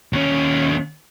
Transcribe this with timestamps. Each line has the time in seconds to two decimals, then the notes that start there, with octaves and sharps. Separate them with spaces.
0.13 D#2 C#4